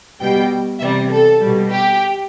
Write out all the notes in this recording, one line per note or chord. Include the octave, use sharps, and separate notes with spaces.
B2 G3 G5
C3 E3 G3 E5
A4
B2 G3
G4